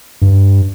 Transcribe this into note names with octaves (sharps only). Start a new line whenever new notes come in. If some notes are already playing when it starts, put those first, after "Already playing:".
G2